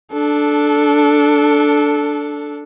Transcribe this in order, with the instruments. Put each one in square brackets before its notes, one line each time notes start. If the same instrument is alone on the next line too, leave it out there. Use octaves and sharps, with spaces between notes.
[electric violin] D4 A4